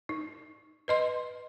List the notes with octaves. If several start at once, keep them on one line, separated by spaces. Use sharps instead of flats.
D#4
B4 D#5 C6